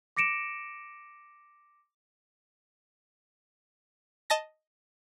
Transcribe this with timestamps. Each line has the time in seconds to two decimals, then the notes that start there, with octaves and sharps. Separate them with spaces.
0.17 D6 A#6 C#7 D7 E7
4.30 D#5 A5 A#6